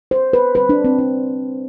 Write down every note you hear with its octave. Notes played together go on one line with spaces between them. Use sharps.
C5
B4
D3 G3 C4 B4
D4
C4
D4